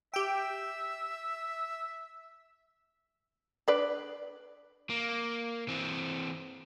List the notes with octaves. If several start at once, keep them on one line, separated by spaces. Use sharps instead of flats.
G4 E5 G5
D4 B4 D5
A#3
E3 C4